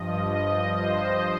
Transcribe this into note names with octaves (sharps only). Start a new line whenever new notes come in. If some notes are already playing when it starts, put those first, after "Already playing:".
Already playing: G2 F3 D#5
D#5
C5